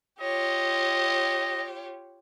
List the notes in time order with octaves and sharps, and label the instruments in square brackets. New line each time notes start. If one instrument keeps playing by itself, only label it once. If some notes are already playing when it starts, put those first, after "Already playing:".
[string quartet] F4 G4 C#5 [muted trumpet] D#5